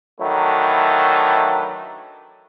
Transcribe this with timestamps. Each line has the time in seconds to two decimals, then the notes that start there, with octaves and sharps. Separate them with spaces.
0.21 D#3 E3 F#3 A3 D4 E4